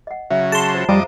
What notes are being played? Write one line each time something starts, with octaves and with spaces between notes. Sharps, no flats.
D#5 F#5
C#3 F#3 E5
G#4 A5 C6
F4 C5
F2 G3 C5 D#5 F5 A#5 D6